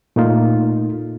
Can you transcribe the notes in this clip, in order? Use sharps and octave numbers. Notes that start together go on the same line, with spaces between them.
A#2 A3 A#3 D#4 F4